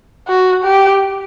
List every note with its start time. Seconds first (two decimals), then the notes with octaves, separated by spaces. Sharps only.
0.28 F#4
0.64 G4